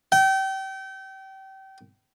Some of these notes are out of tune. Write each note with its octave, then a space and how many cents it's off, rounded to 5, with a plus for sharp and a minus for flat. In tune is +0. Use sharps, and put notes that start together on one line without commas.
G5 -30